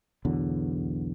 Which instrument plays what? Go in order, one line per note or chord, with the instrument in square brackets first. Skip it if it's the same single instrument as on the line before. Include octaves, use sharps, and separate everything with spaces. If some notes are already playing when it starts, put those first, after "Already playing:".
[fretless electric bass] B1 E2 D3 F#3